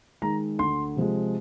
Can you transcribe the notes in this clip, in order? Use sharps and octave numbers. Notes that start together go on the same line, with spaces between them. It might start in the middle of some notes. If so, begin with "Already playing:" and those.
D#3 G#3 A#5
D2 C6
C3 F3 G#3